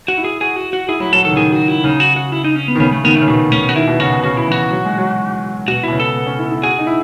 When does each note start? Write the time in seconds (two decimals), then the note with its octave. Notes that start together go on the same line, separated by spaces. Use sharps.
0.08 F#4
0.17 E4
0.24 G#4
0.41 F#4 G#4
0.56 F#4
0.73 F#4
0.88 E4 G#4
1.00 F#3 E4
1.13 F#3 A4
1.25 D#3 A4
1.32 C#3
1.37 D#3 G#4
1.52 F#4
1.68 E4
1.84 C#3 D#4
2.00 F#4
2.16 F#4
2.32 E4
2.44 D#4
2.56 C#4
2.68 B3
2.75 D#3
2.80 C#3 B3
2.92 A3
3.04 D#3 B3
3.16 A3
3.21 C#3
3.28 B2 A3
3.52 C#3 C#4
3.69 F#4
3.76 D#3 E4
3.87 B2
4.00 C#3 F#4
4.12 B2
4.23 C#3 F#4
4.37 E4
4.48 E3
4.52 F#4
4.71 F#3
4.85 G#3
4.98 F#3
5.68 B2 F#4
5.83 B2 E4
5.92 C#3
6.00 A4
6.15 B3
6.27 C#4
6.39 E4
6.51 E4
6.63 F#4 G#4
6.79 D#4
6.87 E4